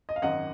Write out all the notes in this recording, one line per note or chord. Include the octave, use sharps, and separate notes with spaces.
D#5
F5
G#1 F#2 D#3 D#5 F#5